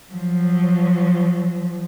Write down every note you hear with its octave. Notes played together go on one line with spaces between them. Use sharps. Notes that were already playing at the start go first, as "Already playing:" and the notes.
F3 F#3